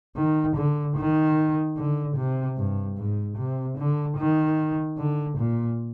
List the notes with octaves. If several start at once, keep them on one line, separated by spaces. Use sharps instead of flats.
D#3
D3
D#3
D3
C3
G2
G#2
C3
D3
D#3
D3
A#2